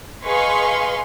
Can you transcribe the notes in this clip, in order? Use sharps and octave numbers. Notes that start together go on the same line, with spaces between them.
G#4 B4 D#5 F5 C6 C#6